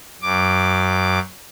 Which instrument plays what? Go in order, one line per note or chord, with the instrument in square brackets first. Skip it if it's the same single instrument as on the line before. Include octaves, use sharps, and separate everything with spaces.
[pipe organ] F#2 D6